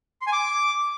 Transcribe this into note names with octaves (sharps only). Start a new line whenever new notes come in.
C6
G#5
D6